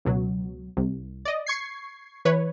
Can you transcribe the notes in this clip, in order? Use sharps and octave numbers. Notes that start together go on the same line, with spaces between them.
C#2 B2 F#3
C2
D5 D#5
C#6 G#6 C7
E3 B4 C#5